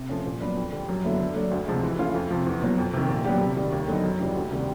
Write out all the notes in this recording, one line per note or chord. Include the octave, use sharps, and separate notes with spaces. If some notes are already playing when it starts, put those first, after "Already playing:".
Already playing: C3
F3 A3 C#4
A#2
F#3 B3 D4
F2
D3 G3
F#2
D3 F#3 B3 E4
D3
F#3 A3 D4
D2
C3 F3 G#3
E3
A3 C#4 F4
F2
C3 F3
E2
B2 F#3
F2
C3 D#3
A#2
F#3 B3 D4 G4
C3
D#3 G3
D#2
D3 F#3 B3 D#4
F#2
C#3 E3 G3
D2
C3 D#3 G3